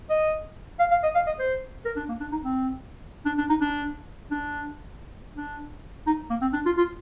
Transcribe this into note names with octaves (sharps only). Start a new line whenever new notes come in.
D#5
F5
F5
D#5
F5
D#5
C5
A#4
D4
A#3
D4
D#4
C4
D4
D4
D#4
D4
D4
D4
D#4
A#3
C4
D4
F4
F4